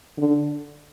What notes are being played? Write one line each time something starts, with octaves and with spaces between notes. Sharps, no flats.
D3